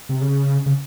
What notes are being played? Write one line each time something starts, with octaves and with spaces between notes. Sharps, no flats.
C3
C#3
C#3